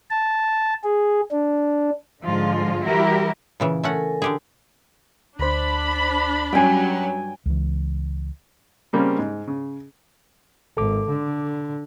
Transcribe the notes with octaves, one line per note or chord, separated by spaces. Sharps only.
A5
G#4
D4
G#2 D3 F3 G#3 F4
E3 G3 E4 F#4 G4 A#4
A#2 C#3 E3
A3 C#4 A4 A#4 F#5 G#5
D3 G4 G#4
D2 D4 C5 B5
G2 F#3 G3 C#4 G5 G#5
C#2 E3
C#3 G3 A#3 C4 C#4
G#2
C#3
G#1 A4 D6
D3